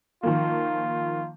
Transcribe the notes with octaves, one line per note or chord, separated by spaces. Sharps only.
D#3 F3 A#3 F4